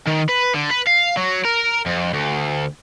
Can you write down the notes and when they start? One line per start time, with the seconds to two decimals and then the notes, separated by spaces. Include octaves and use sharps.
0.07 D#3
0.29 B4
0.55 D3
0.71 B4
0.87 F5
1.17 F#3
1.45 A#4
1.86 F2
2.13 D2